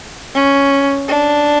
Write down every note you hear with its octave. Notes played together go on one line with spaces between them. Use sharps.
C#4
D4